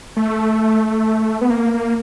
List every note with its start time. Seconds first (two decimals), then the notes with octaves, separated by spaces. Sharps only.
0.16 A3
1.41 B3
1.50 A#3
1.74 A#3